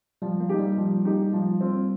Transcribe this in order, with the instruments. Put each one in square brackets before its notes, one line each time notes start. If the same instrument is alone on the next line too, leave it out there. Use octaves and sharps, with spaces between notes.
[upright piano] F3 [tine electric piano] G3
[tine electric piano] A#3
[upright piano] D#4 G4
[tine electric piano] G3
[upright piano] F3
D#4 G4
F3
C4 F4